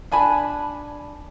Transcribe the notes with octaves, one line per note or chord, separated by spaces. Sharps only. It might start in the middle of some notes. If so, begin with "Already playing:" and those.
D4 G#5 A5 B5